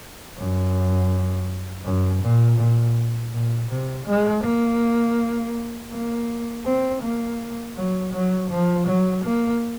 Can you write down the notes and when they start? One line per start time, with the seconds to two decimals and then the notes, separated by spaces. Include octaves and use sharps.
0.37 F#2
1.84 F#2
2.22 A#2
2.58 A#2
3.32 A#2
3.69 C3
4.07 G#3
4.43 A#3
5.92 A#3
6.65 C4
7.02 A#3
7.76 F#3
8.13 F#3
8.50 F3
8.87 F#3
9.24 A#3